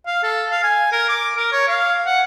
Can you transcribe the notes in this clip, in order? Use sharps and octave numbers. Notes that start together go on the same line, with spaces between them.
F5
A4
F5
G#5
A#4
D6
A#4
C#5
F5
F#5